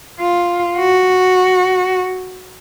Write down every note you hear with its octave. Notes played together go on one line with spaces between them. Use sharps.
F4
F#4